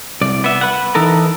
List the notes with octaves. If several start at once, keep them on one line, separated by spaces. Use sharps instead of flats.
C2 D5
B3 E5
B4 F#5
E3 D#4 A4 A#4